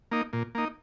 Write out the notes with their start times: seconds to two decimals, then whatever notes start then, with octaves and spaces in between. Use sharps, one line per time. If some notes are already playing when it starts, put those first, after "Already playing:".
0.11 A#3 D#4
0.33 A#2
0.55 A#3 D#4